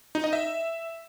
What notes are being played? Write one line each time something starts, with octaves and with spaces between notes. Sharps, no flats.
D#4
D#5
E5